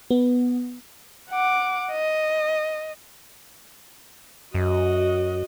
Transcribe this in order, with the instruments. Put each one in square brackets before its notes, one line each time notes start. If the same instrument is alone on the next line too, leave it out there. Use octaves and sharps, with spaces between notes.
[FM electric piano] B3
[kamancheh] F#5 D6
D#5
[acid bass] F#2 [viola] F#4 D#5